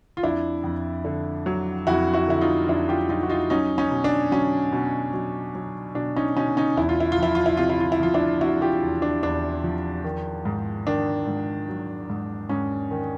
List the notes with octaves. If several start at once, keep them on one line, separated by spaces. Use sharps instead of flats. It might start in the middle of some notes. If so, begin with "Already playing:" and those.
F4
F2 D4 E4
F2
D3
F#3
F2 E4 F#4
E4 F#4
D3 E4
D#4 F4
F2 D4 E4
F4 G4
F#3 D#4 F4
F#4
D#4 F4
F#3 C#4 D#4
C#4 D#4
B2
D4
F#3 C#4
B2
F#3
F#3
B2 D4
C#4 D#4
B2 C#4 D#4
C#4 D#4
E2 E4
F4
E4
F4
F3 E4
F4
E4
C3 F4
E4
F4
E4
F3 F4
D4 E4
C3 E4 F#4
F4 G4
E2
D4
E2 D4
F3
D#3
G#2
D#3 D4
G#2
F#3
G#2
G#2 C#4
D#3